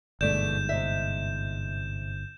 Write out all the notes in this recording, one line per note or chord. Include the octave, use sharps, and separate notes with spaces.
G1 G#2 B2 A3 D5 G6 E7
C3 D#5 E5